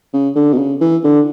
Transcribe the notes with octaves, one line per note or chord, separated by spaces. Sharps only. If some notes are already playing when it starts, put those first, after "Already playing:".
C#3
D3
B2
C#3
E3
D3